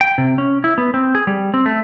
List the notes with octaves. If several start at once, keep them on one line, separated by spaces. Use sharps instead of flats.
G5
C3
C#4
E4
B3
C4
G#4
G3
C4
A3